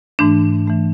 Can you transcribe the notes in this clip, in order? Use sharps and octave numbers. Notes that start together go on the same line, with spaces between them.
G#2 E3 A3 D4
E3 A3